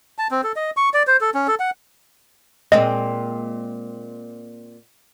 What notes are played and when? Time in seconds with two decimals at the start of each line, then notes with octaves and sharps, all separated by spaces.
0.19 A5
0.31 C4
0.43 A4
0.56 D#5
0.77 C#6
0.94 D5
1.07 C5
1.21 A4
1.35 C#4
1.47 A4
1.60 F#5
2.72 A#2 G#3 C4 D#5